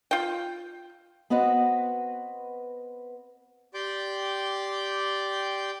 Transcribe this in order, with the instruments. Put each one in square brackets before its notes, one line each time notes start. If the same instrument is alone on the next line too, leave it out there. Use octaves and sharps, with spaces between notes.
[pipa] F4 G5
[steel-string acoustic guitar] B3 C4 F#4 B4 D#5
[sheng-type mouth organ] G4 D5 G5 C6 D6 G6